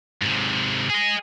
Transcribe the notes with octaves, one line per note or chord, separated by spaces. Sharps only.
G#2 C3
G#4 D#5